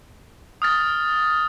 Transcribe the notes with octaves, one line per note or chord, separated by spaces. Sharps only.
D#6 F6 A6